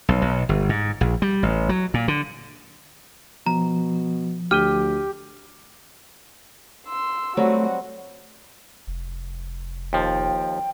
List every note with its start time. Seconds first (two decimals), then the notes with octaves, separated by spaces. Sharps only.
0.09 B1
0.22 B1
0.49 G1
0.69 G#2
1.01 A#1
1.22 G3
1.43 A1
1.69 F#3
1.94 A#2
2.08 D3
3.46 B2 F3 A#5
4.51 D2 G4 F6 D#7 G7
6.88 C6 E6
7.37 F#3 G3 A3 C4 F#4
8.87 F1
9.93 D#2 F3 G5